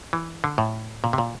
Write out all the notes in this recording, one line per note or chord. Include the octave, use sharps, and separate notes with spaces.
E3
D3
A2
A#2
C3
A#2